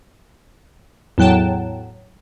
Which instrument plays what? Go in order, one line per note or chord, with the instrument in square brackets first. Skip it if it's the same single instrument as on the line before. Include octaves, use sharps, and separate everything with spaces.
[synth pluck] E2 A2 F#3 G5 A5 E7